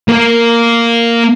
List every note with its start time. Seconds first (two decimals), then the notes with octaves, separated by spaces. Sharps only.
0.08 A#3 A#4